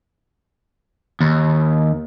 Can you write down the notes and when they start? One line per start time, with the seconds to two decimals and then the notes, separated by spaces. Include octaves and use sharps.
1.21 D#2